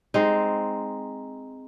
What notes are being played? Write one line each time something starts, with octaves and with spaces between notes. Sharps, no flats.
G#3 C4 D#4